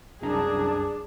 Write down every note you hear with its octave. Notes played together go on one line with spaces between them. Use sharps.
C2 F#2 D4 G#4 A5 A#5